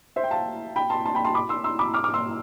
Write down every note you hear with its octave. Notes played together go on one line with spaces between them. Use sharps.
C5 E5
G5
F5 A5
G5 B5
A5 C6
A5 C6
G5 B5
A5 C6
B5 D6
C6 E6
C6 E6
B5 D6
D6 F6
D6 F6
C6 E6